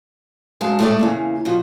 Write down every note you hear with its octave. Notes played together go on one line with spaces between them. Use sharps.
F#2 G#3 F5 A5
A2 G#3 A3 F#4 D5 A5
E2 C#3 A#3
B2 F3